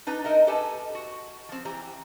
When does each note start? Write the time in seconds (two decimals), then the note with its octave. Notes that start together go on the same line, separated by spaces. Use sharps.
0.07 D4 D#4 B4 A#5
0.24 D#4 A#4 D#5 E5
0.47 G4 A4 B4 G#5 A5
0.95 F#4
1.49 F3 C4
1.65 E3 G4 A#5